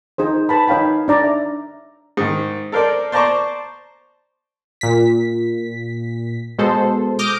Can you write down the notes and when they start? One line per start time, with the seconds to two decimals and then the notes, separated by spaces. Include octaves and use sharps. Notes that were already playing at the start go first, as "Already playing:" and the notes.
0.18 D#4 G#4 C5
0.49 B4 A5 B5
0.67 D#4 C#5 F5 G5 B5
1.08 D4 D5 A#5
1.24 E5
2.17 G#2 D#3
2.72 A4 A#4 C5 D5
3.12 C5 D5 A5 A#5 C#6 D6
4.81 A#2 B6
6.58 B2 G#3 A4 C5
7.19 D6 D#6 F6 G6 A#6 D7